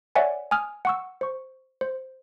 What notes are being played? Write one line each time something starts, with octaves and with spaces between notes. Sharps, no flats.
C#5 D5 E5 F#5 G#5
G#5 D#6 F6
F#5 C#6 E6
C5 C#6
C5